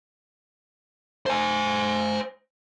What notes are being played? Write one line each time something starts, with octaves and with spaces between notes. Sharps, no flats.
C5 G#5